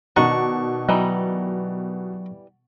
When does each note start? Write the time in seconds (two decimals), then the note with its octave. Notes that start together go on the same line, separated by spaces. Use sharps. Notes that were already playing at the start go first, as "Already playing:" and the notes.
0.16 B2 D#3 D4 D#4 F#5 C#6
0.89 E3 F#3 G3 D#4